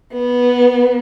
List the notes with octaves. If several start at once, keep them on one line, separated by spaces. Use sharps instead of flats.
B3